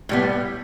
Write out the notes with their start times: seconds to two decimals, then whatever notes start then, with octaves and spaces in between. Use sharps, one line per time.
0.09 A2 G3 B3